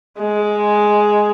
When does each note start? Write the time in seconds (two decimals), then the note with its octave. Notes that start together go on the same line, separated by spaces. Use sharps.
0.19 G#3